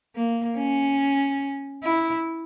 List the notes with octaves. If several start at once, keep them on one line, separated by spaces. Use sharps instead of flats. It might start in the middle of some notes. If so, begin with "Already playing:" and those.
A#3
C#4
E4